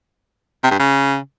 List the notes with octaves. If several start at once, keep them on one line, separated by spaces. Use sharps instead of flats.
C3
G2
C#3